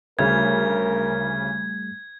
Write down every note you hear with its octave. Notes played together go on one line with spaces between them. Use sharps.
D2 C#3 G3 A3 A#4 G#6